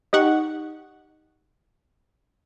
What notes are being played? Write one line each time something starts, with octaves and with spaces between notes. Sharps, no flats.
D#4 G4 F#5 C#6